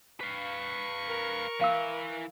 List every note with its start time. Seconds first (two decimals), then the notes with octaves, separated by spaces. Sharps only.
0.21 B4 F5 C#6
1.08 A#4
1.61 E3 F5 E6